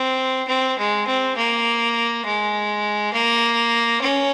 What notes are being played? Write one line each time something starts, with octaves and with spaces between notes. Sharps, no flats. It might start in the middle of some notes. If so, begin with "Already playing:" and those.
Already playing: C4
C4
G#3
C4
A#3
G#3
A#3
C#4